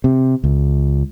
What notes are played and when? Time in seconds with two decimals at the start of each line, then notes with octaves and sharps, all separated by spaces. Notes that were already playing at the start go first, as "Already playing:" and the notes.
0.04 C3
0.44 C#2